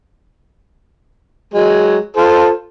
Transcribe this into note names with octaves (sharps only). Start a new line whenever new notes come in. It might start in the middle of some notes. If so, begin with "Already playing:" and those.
F#3 G#3
F4 A4 C5